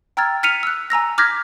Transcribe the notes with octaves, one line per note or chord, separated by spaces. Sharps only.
G5 A#5 E6 F6 G#6 A6
F6 B6 C#7 D#7 F7
E6 F#6
G#5 A#5 E6 A#6
D6 F6 G6 G#6 A#6 B6